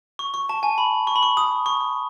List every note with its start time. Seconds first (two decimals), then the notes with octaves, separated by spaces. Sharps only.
0.19 C#6
0.34 C#6
0.49 A5
0.63 G#5
0.78 B5
1.07 C#6
1.16 B5
1.23 C#6
1.37 D#6
1.66 C#6